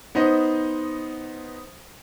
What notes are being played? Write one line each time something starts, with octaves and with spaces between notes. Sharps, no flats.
B3 D#4 C5 D#5